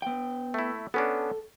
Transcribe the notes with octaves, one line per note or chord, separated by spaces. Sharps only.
B3 G5
A3 E4
B3 C#4 D4 A4